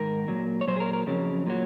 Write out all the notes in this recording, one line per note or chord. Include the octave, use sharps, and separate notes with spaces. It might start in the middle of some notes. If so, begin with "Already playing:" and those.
Already playing: G#2 D#3 A#4
A#2 F#3
C#5
A#2 F#3 C5
G#4
A#4
A#4
F2 C#3 F#3
A#2 F#3